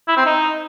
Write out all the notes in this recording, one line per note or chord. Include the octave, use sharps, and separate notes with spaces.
E4
C4
D#4